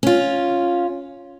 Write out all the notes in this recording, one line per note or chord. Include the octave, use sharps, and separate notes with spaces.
C#4 F4